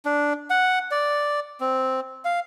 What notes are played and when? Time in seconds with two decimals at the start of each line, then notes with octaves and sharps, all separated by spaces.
0.05 D4
0.50 F#5
0.91 D5
1.61 C4
2.25 F5